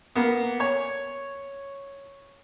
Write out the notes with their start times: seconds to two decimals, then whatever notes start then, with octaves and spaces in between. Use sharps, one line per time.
0.15 A#3 B3
0.60 C#5